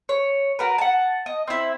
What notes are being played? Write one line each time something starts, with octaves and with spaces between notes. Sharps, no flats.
C#5
F#4 A#4 B4
F#5 A5
D#5
C4 E4